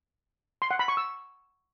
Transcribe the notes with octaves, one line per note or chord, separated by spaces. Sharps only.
C6
F#5
B5
C#6
E6